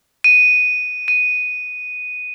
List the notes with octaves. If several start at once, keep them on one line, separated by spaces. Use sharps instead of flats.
D#7
D#7